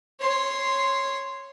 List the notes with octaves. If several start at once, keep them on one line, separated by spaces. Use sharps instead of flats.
C#5 C6